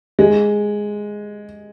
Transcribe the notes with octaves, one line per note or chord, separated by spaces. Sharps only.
G#3